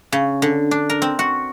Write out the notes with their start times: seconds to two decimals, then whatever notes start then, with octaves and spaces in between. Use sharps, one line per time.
0.12 C#3
0.42 D3
0.71 D4
0.90 A#4
1.02 C4
1.19 F#4